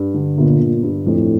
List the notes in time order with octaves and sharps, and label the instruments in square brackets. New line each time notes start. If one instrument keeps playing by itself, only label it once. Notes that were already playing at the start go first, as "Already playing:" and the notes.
Already playing: [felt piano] G2
D3
[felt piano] G1 [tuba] A#2
[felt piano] G1
G2
[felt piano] F2 [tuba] A2